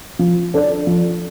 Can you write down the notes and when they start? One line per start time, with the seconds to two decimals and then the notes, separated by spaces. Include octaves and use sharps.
0.19 F3
0.54 D4 A4 D5
0.87 F3